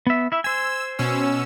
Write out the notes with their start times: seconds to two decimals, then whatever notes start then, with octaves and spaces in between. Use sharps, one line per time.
0.07 B3 E5
0.32 E4 E5
0.44 C5 G#5 E6
0.99 B2 C#4 E6